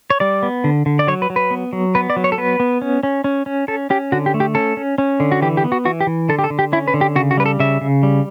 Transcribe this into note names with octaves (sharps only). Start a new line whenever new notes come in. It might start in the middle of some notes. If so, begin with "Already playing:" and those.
C#5
G3 D5
B3
D3
D3
D5
F#3 C#5
B4
F#3
B4
B3
F#3
B3 B4
D5
F#3
C#5
A4
B3 B4
B3
C#4
C#4
C#4
C#4
C#4 A4
C#4 G4
D3 F#4
G4
A3
G4
C#4 A4
C#4
C#4
D3
F#4
E3 G4
G4
B3
F#4
E3 F#4
G4
E3
D3 A4
G4
A4
D3
G4
C#4 E4
B4
D3
G4
C#3 F#4
F#4
G3 B4
A4
C#3 E5
C#3
G3